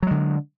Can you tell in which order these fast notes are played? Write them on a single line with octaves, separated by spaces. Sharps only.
F#3 G#3 D3